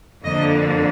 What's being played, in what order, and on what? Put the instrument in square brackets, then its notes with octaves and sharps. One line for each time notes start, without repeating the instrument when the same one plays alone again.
[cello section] F2 D3 F3 A#3 D#5